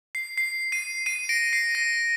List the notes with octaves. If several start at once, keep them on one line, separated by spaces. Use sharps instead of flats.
C7
C7
C7 D#7
C7 D#7
A#6 D7
C7
A#6